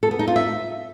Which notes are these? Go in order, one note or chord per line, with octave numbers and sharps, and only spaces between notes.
A4
B3
D#4
F4
E5